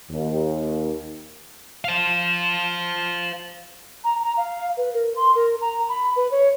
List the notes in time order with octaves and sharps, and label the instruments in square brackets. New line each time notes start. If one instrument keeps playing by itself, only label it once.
[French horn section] D#2
[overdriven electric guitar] C5 F5
[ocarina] A#5
A#5
F5
B4
A#4
C6
A#4
A#5
B5
B4
C#5